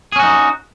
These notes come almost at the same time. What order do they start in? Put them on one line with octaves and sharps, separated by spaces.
G#4 C#4 F#4 D#4